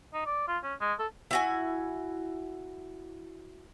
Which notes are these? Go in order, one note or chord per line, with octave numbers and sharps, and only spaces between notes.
D#4
D5
F4
C#4
G#3
A4
E4 F#4 G#5